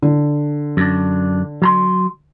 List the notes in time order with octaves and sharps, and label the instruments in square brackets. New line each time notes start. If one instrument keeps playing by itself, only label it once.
[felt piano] D3
[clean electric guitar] F#2 D4
F#3 A#5 C6